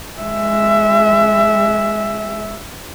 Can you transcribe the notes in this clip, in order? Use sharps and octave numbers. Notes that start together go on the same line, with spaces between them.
G#3 E5